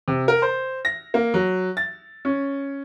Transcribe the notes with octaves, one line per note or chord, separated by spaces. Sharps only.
C3
A#4
C5
A#6
A#3
F#3
A6
C#4